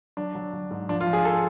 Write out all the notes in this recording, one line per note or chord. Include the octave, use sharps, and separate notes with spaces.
F#3 D4
F#3
F#3
G#2
F3 D4
F4
F3
G#4
A4